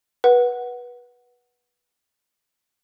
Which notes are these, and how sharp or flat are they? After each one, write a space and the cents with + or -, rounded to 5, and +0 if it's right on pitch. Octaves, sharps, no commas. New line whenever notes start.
B4 -20 F#5 +0